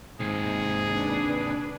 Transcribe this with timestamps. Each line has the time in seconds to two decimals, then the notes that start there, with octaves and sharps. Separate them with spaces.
0.20 D#2 G#2 C3 G#4
0.91 D4 B4